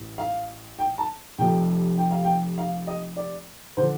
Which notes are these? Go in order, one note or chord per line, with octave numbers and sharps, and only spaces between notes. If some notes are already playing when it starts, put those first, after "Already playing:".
Already playing: A1
F5
G5
A5
F1 F2 C3 G5
G5
F5
G5
F5
D#5
D5
D3 F3 C5